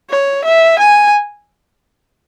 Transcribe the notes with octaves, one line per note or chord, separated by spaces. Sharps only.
C#5
E5
G#5